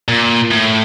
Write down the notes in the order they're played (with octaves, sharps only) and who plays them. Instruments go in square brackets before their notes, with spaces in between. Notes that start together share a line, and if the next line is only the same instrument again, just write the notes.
[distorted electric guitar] A#2
A2